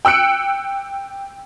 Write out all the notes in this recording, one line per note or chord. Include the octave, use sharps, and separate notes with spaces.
G5 E6 F#6 C#7 D7